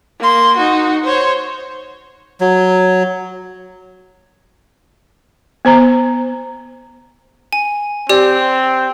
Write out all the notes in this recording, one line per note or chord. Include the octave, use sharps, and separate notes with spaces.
A#3 C6
D#4 F#4
C5 C#5
F#3
B3 C5 A#5
G#5
C4 G4 D5